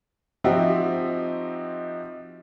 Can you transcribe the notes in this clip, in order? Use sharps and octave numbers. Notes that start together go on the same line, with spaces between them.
F3 C4 D#4 F#4 G4 E5